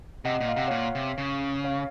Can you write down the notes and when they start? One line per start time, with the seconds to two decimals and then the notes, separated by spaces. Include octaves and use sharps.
0.25 C3 D#5 F#5
0.40 A#2
0.48 F5
0.56 C3 F#5
0.68 A#2 C#5 F5
0.95 C3
1.18 C#3
1.64 C#5 F5